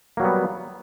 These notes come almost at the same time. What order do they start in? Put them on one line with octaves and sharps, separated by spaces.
A#3 F#3 G3 B3